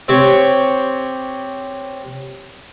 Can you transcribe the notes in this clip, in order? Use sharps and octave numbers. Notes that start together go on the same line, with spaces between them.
C4 G4 C#5